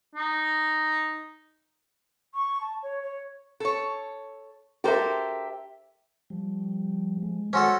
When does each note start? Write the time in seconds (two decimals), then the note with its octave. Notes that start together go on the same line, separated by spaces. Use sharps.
0.15 D#4
2.34 C#6
2.61 A5
2.82 C#5
3.03 C#5
3.60 A4 C#5
4.84 G4 A4 A#4 C5 E5
6.30 F3 G3
7.23 G#3
7.53 G#3 C#4 F#4 A4 C5 G#5 C6